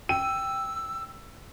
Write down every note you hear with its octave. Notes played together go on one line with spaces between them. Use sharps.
G5 E6 D#7